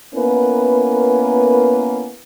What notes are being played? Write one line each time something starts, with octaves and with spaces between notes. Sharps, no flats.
A#3 B3 C#4 E4 A#4 B4